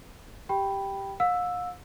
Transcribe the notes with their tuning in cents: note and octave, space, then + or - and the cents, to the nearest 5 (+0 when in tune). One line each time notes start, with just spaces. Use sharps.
G4 +0 G5 +0 B5 +0
F5 +40 E6 +0